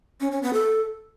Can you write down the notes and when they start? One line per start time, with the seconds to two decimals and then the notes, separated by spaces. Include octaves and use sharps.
0.21 C#4
0.32 C#4
0.43 B3
0.53 A4